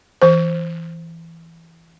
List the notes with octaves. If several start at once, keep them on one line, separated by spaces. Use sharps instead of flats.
E3 C5